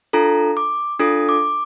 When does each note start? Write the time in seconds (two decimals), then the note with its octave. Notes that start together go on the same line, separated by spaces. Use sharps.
0.13 D4 F4 A4 A#5
0.57 D6
0.99 D4 F4 A4 D#6
1.29 D6